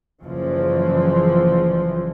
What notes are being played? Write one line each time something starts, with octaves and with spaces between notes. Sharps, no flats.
F#1 E3 F3